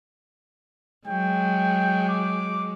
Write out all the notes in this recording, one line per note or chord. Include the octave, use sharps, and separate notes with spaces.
F#3 G#3 G5
D6